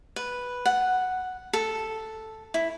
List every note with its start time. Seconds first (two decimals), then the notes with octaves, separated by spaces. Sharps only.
0.16 B4
0.66 F#5
1.53 A4
2.54 E4